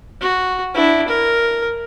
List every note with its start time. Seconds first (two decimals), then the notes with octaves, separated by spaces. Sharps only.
0.21 F#4
0.74 D4 E4
1.08 A#4